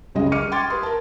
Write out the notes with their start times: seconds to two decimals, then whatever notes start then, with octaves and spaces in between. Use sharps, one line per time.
0.15 C2 F#2 C#3 G3 G#3 D#5
0.32 D6 F6 C#7 D#7
0.52 G5 C6 D6 G#6 A6
0.69 G4 B4 C6 D#6
0.83 A#4 A5